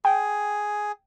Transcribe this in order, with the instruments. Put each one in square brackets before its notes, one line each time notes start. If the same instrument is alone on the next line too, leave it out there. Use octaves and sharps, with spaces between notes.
[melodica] G#4 [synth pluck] G5